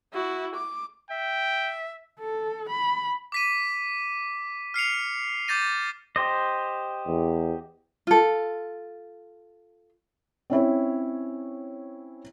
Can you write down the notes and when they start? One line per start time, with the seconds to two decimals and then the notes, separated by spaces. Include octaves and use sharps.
0.13 E4 F#4
0.54 D6
1.11 E5 G5
2.20 A4
2.70 B5
3.32 D6 B6 D#7
4.74 F6 C7 C#7 F7
5.48 D6 G6 A6 A#6 D#7
6.16 G4 C5 D#5
7.07 E2
8.07 F4 A4
10.50 C4 C#4 E4 C#5